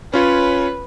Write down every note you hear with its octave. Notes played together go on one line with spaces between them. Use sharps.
C#4 F4 B4 C#5